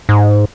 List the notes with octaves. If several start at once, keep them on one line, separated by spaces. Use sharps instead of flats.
G#2